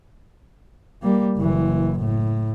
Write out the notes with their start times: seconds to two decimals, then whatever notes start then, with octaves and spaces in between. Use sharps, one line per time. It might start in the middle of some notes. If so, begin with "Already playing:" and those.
1.02 G3 A#3
1.37 F#1 E3
1.99 A2